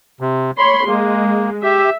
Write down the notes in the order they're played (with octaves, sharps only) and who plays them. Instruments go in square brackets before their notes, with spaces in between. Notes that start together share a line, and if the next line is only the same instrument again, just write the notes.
[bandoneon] C3
[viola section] C#5 C6 [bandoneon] B5
[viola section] G#3 [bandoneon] A#3
[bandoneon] G4 [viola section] E5